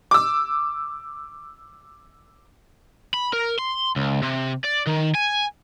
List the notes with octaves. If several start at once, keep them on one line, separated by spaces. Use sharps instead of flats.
D6 E6
B5
A#4
C6
C#2
C3
D5
D#3
G#5